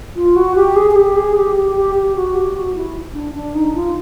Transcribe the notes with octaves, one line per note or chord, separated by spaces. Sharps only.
F4
F#4
G4
G#4
G#4
G4
G#4
G4
G4
G4
G4
F#4
G4
F#4
E4
D4
D4
D#4
F4